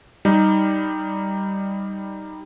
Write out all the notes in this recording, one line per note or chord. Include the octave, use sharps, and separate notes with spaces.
G3 D#4